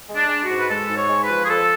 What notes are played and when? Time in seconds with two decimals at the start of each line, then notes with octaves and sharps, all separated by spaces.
0.09 G#3
0.15 D4
0.29 G#3
0.42 F#4
0.49 G#2
0.59 B4
0.69 G#3 A4
0.89 G#2
0.96 C#5
1.09 G#3
1.22 B4
1.29 F3
1.44 G#4
1.49 F2 A4